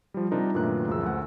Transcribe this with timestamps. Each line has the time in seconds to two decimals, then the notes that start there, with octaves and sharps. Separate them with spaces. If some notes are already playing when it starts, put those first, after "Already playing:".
0.14 F3 G3
0.31 C3 G3 D4 D#4 F4 A#4
0.55 F#2 A#2 D#3 A3 B4 F#6
0.87 C#2 F#2 F3 F#4 G#4 E6
1.03 D2 F#5